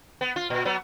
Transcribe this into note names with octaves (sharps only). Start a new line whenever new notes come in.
B3
F4
A#2
F#3 B3